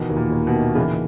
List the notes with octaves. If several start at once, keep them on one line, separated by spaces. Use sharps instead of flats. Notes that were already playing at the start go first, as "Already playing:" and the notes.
Already playing: B2 D#3 E3
D#2
A#2
D#2
B2
D#3
A#2 C#3 E3